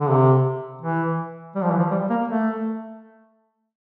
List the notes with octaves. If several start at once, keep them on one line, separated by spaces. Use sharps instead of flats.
D3
C3
E3
G3
F3
E3
F3
G3
A#3
A3